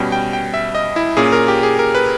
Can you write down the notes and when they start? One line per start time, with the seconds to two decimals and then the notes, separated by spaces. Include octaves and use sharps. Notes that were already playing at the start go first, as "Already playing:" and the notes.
Already playing: B2 G3 C#4 G5
0.12 G5
0.33 G5
0.54 E5
0.75 D#5
0.96 E4
1.17 A#2 A#3 C#4 G#4
1.32 A#4
1.48 G4
1.63 G#4
1.79 A#4
1.95 B4